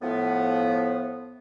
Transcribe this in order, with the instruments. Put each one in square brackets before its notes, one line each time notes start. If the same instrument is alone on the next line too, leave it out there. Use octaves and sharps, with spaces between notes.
[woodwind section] A2 F3 B3